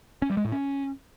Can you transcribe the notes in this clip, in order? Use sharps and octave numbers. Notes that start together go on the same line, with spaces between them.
C#4
G3
G#3
A2
C#4